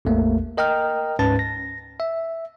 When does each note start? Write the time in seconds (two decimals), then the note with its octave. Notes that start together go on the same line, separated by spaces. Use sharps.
0.05 A1 E2 A3 A#3
0.57 A#4 D#5 G5 A#5 F6
1.19 D2 G#2 C#4 B4 A5 A6
1.39 A#6
2.00 E5